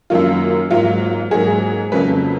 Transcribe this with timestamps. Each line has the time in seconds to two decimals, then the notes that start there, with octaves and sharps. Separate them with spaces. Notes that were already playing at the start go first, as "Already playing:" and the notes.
0.10 F#2 D#3 F#3 A#3 F4
0.71 G#2 F#3 A#3 F4
1.31 G#2 F#3 A#3 G#4
1.92 F2 C#3 F#3 A#3 B4